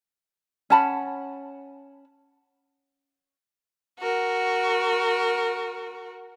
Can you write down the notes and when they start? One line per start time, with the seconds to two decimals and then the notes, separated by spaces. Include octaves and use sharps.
0.70 C#4 F#5 A5 B5
3.99 F#4 A#4